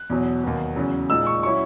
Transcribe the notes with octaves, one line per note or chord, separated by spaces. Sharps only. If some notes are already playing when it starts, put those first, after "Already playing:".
Already playing: F#6
E2 B2 F#3
D#2 D#3 F#3 B3
E2 C#3 F#3
A#2 G#3 D#4 E6
C#6
F#3 C#4 E4 C#6